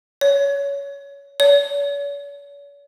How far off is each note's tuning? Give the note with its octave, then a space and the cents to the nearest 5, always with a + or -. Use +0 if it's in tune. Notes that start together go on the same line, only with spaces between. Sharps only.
C#5 +20
C#5 +45